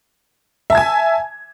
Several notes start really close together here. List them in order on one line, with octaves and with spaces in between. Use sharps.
E5 A5 G#6 G#5